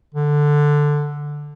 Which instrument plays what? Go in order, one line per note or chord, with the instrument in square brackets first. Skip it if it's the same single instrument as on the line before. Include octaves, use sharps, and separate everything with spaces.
[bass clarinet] D3